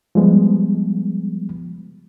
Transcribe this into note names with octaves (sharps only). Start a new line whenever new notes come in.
F3 G3 G#3 B3